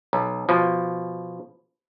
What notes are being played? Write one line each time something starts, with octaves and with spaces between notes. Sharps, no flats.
B1
B2 F3